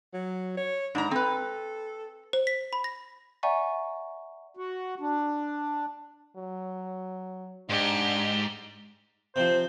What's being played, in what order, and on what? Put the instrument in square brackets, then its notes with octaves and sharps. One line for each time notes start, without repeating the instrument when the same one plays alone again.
[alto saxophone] F#3
C#5
[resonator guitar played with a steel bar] G#2 A#5 [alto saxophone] D4
[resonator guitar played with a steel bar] C4 B4 [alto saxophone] A4
[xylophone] C5
B6
B5
A#6
D5 E5 F#5 G#5 A#5 C#6
[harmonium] F#4
D4
[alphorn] F#3
[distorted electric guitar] G#2 [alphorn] D4 [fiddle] G4
[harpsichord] C3 F3 [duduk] C5